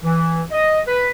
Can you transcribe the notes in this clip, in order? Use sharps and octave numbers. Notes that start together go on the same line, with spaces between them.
E3
D#5
B4